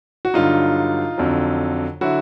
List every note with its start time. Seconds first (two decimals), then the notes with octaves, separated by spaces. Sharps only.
0.25 F#4
0.34 G2 D3 F#3 D#4 F4
1.18 F2 D3 F#3
2.01 D3 F#3 E4 F#4